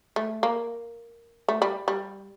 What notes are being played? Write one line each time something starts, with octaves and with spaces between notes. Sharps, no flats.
A3
A#3
A3
G3
G3